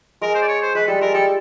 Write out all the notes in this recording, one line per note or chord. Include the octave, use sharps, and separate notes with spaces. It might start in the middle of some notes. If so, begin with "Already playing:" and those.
G#3 A#4
C5
D5
C#5
C5
G#3 B4
G3 A4
G#3 A#4
G3 A4